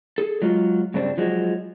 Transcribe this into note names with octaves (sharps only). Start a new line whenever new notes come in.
G#4 A4
F#3 G#3 F4
G2 C#3 C4 D4
F3 F#3 G#3